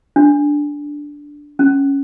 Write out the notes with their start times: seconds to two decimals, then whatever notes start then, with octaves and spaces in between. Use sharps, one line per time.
0.16 D4
1.59 C#4